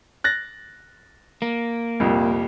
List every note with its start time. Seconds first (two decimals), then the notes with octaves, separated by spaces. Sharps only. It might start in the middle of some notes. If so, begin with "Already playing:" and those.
0.24 F#6 A6 A#6
1.42 A#3
2.00 C2 F2 A#2